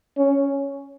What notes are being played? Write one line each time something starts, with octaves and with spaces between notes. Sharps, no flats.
C#4